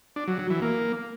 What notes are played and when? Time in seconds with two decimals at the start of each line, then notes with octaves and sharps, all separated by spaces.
0.16 D4
0.28 F#3
0.39 F#3
0.50 E3
0.62 A#3